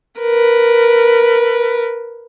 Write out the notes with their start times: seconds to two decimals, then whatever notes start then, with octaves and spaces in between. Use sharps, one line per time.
0.20 A#4 B4